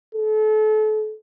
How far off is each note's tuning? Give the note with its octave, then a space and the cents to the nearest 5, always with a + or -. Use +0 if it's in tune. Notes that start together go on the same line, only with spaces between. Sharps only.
A4 -35